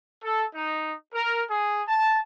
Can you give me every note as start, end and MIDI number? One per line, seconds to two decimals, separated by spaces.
0.23 0.44 69
0.53 0.94 63
1.12 1.43 70
1.48 1.81 68
1.88 2.17 81